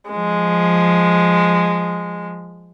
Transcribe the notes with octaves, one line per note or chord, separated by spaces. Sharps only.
F3 G#3